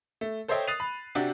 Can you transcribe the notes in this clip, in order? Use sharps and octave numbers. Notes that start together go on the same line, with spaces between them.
A3
A4 C5 C#5 D#5 E5 G5
D#6 F#6 A6 C7 D#7 F7
B5
C3 D4 F#4 G4